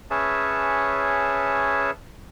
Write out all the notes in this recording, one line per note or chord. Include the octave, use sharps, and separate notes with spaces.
C#4 G#4 B4 C#5 E5 A5